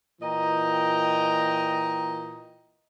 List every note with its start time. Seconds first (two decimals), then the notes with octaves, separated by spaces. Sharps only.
0.22 A#2 E3 D#5 G5 A#5